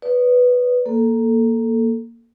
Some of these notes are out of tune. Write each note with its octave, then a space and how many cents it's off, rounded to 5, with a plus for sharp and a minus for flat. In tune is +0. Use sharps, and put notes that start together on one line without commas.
B4 +0 D5 -30 D#6 -10
A#3 +0 A4 +0